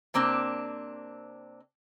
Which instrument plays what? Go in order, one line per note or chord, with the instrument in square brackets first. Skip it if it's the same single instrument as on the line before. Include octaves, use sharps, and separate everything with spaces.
[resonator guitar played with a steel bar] C3 A#3 C4 D4